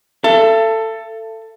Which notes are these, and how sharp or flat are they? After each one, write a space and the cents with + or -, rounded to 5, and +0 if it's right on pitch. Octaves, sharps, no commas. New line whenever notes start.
A4 +15 E5 +45